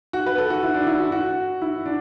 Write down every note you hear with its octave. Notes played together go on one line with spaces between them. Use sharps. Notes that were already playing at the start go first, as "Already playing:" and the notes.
F#4
B4
A4
F#4
E4
D4
E4
F#4
F#4
E4
D4